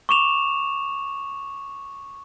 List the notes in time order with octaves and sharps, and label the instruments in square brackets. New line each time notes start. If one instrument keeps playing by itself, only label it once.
[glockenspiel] C#6 D6 E7 F7